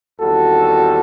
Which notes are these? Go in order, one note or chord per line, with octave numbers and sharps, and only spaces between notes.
E2 D#3 G3 C4 F#4 A4